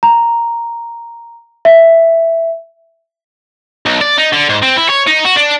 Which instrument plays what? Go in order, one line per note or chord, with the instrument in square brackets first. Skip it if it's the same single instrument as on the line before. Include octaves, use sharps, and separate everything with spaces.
[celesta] A#5
E5
[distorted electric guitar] B1
D5
D#4
D3
G#2
C4
E4
C#5
D#4
F#4
D4